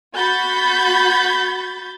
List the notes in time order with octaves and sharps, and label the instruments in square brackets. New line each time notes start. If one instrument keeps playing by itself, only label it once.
[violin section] F#4 B5 G6 A6